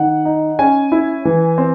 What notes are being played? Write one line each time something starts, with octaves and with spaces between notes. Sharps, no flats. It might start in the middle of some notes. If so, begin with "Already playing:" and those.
Already playing: D#3 F#5
D#4
C#4 G#5
E4
E3
C4